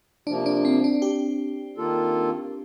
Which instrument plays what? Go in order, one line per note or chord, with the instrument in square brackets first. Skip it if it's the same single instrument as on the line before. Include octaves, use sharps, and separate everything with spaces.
[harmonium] C3 F3 A#3 [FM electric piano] D4
[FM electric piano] D4
C4
D4
G4
[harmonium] D#3 A#3 F4 A4